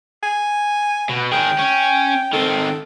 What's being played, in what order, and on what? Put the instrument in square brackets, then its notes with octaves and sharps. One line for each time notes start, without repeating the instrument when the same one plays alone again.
[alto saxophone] G#5
[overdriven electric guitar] B2
[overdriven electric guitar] D#3 G#4 [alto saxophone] G5
[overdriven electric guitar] C#4
[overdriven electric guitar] D#3 C4 [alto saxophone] A4